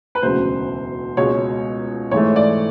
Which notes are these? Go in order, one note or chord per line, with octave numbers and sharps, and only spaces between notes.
B4
E1 D2 C#3 F#3 C5
C#2 B2 G#3 C#5
G#2 E3 A3 C#5
D5